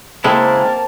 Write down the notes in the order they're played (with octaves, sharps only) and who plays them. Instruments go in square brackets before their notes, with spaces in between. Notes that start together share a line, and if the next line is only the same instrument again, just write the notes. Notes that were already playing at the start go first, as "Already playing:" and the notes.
[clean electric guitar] C#3 G#3 E4 [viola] A#3 A#4 [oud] C4 [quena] A5